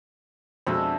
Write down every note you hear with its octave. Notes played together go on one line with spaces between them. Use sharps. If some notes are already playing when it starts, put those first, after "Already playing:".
F2 B2 G#3 D4 F#4 E5